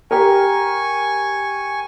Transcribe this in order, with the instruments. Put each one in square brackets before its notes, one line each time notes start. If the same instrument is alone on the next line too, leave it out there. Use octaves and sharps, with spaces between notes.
[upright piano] G4 A#4 [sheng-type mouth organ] G#5 C#6